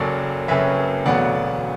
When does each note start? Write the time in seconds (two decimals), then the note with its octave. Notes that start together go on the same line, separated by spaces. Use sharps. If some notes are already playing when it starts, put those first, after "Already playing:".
Already playing: F#1 F#2 F#3 A4 D5
0.48 F#1 F#2 F#3 B4 E5
1.06 E1 D2 D3 F#3 B3 D5 F#5